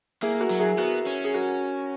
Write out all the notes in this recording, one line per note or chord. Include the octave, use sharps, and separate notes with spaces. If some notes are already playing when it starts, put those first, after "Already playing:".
A#3 E4 G#4
F#4 A#4
F#3
E4 G#4
B3 F#4 A#4
C#4
G#4
F#4 A#4